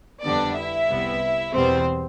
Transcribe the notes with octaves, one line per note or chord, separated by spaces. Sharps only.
F2 D3 G3 B3 D4 D5
E4 E5
C2 C3 G3 B3
E2 B2 G3 B3 C4 C5